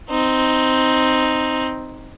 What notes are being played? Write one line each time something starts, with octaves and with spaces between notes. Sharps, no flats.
C4 D#4